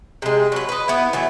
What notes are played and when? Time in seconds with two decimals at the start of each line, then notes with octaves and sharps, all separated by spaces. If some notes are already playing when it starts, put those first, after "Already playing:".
0.22 C3 G#3
0.52 F#3 B4
0.69 B4 D#5
0.88 B3 E4
1.13 E3 F#3 A3